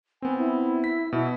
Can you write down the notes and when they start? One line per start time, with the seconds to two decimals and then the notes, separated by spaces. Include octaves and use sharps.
0.22 B3 C4 G#5
0.38 E4
0.84 B6
1.12 B2 E4